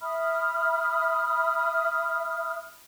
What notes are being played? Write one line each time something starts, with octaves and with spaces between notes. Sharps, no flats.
E5 B5 D#6 F6